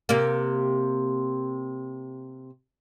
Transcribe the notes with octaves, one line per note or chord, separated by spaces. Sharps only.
C3 A#3